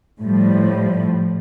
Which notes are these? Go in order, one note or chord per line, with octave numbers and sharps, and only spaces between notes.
A2 F3 G3